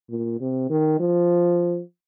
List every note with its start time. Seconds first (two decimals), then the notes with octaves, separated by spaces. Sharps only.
0.10 A#2
0.41 C3
0.70 D#3
1.00 F3